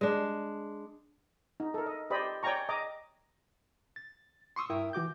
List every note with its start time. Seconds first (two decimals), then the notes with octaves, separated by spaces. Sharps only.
0.01 G#3 D4
1.60 D#4
1.74 A4 A#4
1.86 D#5
2.10 G4 C5 D5 D#5 B5
2.43 C#5 D5 G5 G#5 A#5 C#6
2.69 D#5 A#5 D6
3.96 A6
4.56 C6 C#6 D#6 E6
4.70 G2 E4 A#4 E5 G5 D#6
4.93 E3 F#4 D6 G6